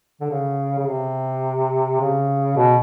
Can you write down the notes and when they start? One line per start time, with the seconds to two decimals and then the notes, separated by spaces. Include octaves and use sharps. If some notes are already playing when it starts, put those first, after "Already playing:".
0.21 D3
0.30 C#3
0.79 C#3
0.87 C3
2.00 C#3
2.57 B2